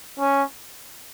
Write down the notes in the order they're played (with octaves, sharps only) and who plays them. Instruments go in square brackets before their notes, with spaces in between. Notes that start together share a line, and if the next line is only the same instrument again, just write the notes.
[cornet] C#4